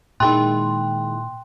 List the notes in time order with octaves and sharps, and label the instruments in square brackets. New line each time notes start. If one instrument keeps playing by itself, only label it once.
[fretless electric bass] A#2 [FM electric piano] D#3 G#3 E4 [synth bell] G5 C6 F#6